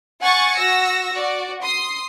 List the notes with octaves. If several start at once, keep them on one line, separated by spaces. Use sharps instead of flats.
F#5 G#5 C#6 A6 C#7
F#4 E6 A#6
F#4 D5
C6 D#6 C7